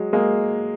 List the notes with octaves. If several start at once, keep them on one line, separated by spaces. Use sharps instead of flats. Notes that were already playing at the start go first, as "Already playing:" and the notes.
Already playing: F#3 G#3
G#3 A#3